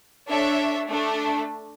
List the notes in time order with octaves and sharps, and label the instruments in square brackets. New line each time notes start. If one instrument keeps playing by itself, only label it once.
[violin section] D4 A4 C#5 E5
A3 D4 A4